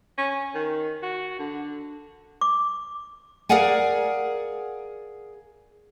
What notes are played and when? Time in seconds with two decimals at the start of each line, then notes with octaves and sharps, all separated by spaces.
0.18 C#4
0.55 D#3
1.03 F#4
1.39 D3
2.41 D6
3.49 G#4 A#4 D5 F5 F#5 G#5